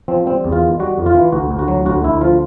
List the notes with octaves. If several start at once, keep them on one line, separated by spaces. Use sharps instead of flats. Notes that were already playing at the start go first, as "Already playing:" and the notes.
F3 C4
G3 C4
E2
F4
D#3
G3 F#4
F2
F4
E3
D2 F#4
D2
F#4
F#3
D2 F#4
D2 E4
F3 F4